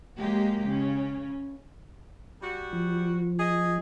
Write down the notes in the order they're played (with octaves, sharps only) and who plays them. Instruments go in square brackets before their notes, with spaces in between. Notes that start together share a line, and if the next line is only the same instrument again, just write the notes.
[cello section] F#3 G#3 A#3 G4
C#3 C#4
[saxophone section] G3 F#4
[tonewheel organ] F3
[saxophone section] G#4 D#5